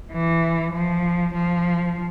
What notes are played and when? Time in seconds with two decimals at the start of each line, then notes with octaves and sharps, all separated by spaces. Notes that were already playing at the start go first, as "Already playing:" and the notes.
0.11 E3
0.73 F3
1.34 F3